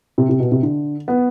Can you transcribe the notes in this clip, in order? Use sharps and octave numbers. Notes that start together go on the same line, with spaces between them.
C3
C3
B2
C3
D3
B3